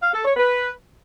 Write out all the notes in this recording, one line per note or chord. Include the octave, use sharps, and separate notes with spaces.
F5
A4
C#5
B4